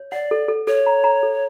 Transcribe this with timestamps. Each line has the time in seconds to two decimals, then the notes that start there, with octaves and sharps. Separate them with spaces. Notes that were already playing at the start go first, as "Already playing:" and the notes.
Already playing: C#5
0.12 D5 F#5
0.31 A4
0.48 A4
0.67 A4 C#5
0.86 A#5
1.04 A#5
1.23 A4